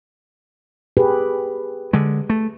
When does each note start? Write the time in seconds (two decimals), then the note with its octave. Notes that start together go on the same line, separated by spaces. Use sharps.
0.97 G4 G#4 B4
1.93 D3 G#3
2.30 A3